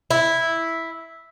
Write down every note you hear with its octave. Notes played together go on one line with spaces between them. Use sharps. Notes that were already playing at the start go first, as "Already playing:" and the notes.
E4